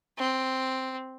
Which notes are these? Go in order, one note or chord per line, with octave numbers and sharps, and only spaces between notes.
C4